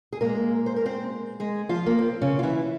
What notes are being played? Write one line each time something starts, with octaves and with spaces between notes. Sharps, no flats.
G#4
A#2 G#3 A#3 A#4
C5
A#4
C4 C5
G#3 G#4
F3 F4
A#3
C4
C#3 C#4
F4
E3 E4